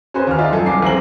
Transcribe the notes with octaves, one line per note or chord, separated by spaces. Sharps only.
C#4 F#4 G#4 B4 C5
D#2 F6
D#4 F4 D5 E5
F#2 A4 G#5
C2 D6 C7
B1 G#3 C4 F#7